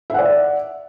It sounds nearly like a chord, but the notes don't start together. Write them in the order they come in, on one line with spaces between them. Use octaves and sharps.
E5 F#5 D5